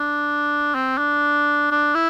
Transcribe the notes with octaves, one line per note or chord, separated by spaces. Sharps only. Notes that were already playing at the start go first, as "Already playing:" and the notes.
Already playing: D4
C4
D4
D4
E4